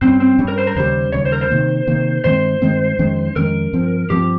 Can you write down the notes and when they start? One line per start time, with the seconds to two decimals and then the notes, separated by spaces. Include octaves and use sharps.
0.01 G2 G3 C4 C#4
0.20 C4
0.38 G2 G3 C#4
0.48 A#4
0.58 C5
0.67 A#4
0.76 D#2 C#3 G3 C5
1.12 D#2 C#3 G3 C#5
1.25 C5
1.32 A#4
1.41 C5
1.50 C3 D#3 A#3
1.87 C3 D#3 A#3
2.24 G2 D#3 G#3 C4 C5
2.62 G2 D#3 G#3 C4
2.99 F2 D#3 G#3 C#4
3.36 F2 D#3 G#3 C#4 A#4
3.73 G2 F3 C4
4.10 G2 F3 C4 G4